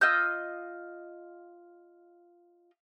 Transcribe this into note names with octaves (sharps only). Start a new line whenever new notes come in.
F4 D#5 E6 G6